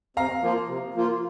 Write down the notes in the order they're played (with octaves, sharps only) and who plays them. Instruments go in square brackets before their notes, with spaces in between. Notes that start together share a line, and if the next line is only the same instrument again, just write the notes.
[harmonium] C3 [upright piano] F5 A#5
[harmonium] F3 A#3 F4
C3
F3 A#3 F4